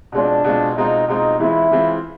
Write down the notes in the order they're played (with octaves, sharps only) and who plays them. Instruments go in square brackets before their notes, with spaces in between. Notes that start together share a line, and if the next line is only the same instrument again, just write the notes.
[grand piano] B2 G#3 C4 F4 [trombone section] D4
[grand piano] B2 G#3 C4 F4
[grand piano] B2 G#3 C4 F4 [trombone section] D#4
[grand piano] B2 G#3 C4 F4 [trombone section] D#4
[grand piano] E3 G#3 C4 F4 [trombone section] E4
[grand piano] E3 G#3 C4 F4